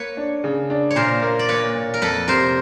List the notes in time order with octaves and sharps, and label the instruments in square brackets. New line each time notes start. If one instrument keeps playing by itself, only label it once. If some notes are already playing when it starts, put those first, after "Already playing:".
Already playing: [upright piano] A#3 [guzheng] B4 C#5
[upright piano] D4
C#3
D4
[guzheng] C#5
[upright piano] A#2 [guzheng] A#4 C5
[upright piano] A#3
[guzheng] D5
[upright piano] A#3 [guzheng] B4 C#5
[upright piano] A#2
[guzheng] A#4
[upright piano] F2 [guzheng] A4 B4
[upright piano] C3 [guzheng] A#4 C5